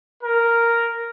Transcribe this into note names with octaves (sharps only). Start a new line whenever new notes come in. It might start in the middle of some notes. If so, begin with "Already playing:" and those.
A#4